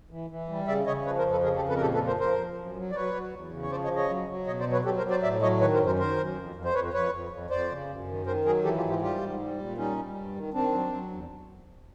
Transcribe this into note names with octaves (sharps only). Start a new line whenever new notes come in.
E3
E3
G3
C#3 D5 E5
C#3 C#5 D#5
F3 B4 C#5
A#4 C5
F2
A4 B4
C#3 G#4 A#4
G4 A4
F2
A4 B4
A#4
A#2 G4 A4
A4 B4
F3
A#4 C5
F3 A#4 C5
F3
F#2
F#3
D5
F#3 B4 C#5
F#3
E2
C#3
C#5
F3 C5 D5
C#5 D#5
C#3
C#5 D#5
F#3
F#3
B2 C#5 D#5
C5 D5
F#3
B4 C#5
F#3 G4 A4
A#4 C5
F#3
C5 D5
A2 D5 E5
F#3 C#5 D#5
D#3 B4 C#5
A#4 C5
F#2
A#4 C5
D#3 A#4 C5
F#2
F2
F2
C5
F2 B4 C#5
F2 B4 C#5
F2
F2
F2 C5 D5
C#3
F#2
D#3
D#3 A#4 C5
F#3 G#4 A#4
E3 G4 A4
F4 G4
G#2
F4 G4
G3 F4 G4
G#2
G3
A#2
G3 C#4 D#4
G3
G2
D#3
D#3 C4 D4
F#3
F#3
E2